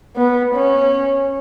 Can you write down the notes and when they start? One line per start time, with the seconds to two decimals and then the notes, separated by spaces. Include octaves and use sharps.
0.16 B3
0.55 C#4